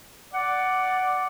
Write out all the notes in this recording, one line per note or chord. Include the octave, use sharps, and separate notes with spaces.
D5 F#5